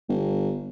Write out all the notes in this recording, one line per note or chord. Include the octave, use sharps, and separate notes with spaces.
G1